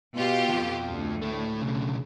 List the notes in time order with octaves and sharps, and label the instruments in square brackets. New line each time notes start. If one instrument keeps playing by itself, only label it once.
[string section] B2 F4 G4
[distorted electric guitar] F2 F3
[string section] D2
[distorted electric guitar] A3 E4
B1 C#3